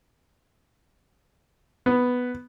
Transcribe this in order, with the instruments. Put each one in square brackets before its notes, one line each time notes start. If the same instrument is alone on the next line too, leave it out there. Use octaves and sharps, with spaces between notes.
[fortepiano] B3